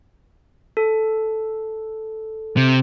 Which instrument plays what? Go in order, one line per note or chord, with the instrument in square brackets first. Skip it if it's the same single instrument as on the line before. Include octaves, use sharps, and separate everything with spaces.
[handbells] A4
[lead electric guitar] C3